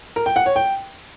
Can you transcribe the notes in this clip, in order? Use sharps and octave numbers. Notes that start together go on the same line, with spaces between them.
A#4
G5
F#5
C#5
G5